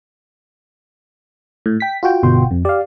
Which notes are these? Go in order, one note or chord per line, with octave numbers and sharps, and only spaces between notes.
A2
G5 B6
F4 F#4 G5
G1 B2 C6
F2
G4 D5 F5